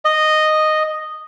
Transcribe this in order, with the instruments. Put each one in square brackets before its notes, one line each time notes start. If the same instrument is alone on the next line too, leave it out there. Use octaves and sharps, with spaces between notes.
[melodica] D#5